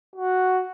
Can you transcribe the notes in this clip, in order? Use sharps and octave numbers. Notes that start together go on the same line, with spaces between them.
F#4